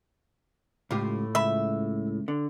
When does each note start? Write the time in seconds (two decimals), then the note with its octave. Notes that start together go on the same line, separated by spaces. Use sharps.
0.91 C#2 A2 F4 G4
1.35 C#2 E5 B5
2.28 D3